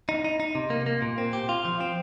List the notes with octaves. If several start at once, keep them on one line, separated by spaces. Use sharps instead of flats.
D#4
D#4
D#4
C3
A#3
A#3
A#2
C4
G4
F4
F3
C4